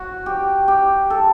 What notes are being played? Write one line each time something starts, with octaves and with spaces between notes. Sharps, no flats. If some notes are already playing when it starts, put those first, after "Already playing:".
Already playing: F#4
G4
G4
A4